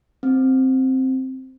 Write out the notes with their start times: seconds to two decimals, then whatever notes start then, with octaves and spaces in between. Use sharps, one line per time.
0.23 C4